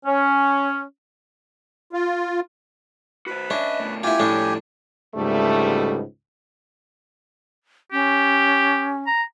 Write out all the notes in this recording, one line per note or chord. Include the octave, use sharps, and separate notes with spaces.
C#4
F4
F#4 B4 C5
C#4 D4 D#5 E5
B2 A3
E4 F4 G4 G#5
A2 F3 G3 C#4 D4
C#2 G#2 B2 D3 G3 A3
C#4 G4
A#5